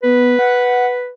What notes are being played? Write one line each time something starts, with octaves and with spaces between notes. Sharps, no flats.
B3 B4
F#5